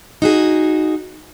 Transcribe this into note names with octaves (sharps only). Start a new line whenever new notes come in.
D#4 F#4 G#4